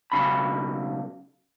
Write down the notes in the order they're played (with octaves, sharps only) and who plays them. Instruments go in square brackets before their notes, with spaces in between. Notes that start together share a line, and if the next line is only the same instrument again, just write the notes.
[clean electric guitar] B1 C#3 B5